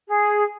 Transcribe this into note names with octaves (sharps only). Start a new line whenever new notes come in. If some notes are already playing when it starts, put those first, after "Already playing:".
G#4